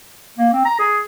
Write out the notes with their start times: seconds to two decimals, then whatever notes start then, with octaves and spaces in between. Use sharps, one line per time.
0.38 A#3
0.53 C4
0.65 A#5
0.79 G#4